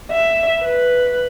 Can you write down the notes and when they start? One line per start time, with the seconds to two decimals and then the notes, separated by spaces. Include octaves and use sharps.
0.12 E5
0.60 B4